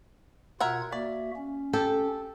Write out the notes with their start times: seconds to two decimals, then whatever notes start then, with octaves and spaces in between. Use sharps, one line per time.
0.60 B2 F4 A#4 E5 F#5 G#6
0.92 A#3 F#4 D5 E5
1.36 C#4
1.73 G4 A4